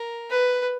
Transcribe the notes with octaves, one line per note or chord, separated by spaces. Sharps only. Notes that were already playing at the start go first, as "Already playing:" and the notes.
Already playing: A#4
B4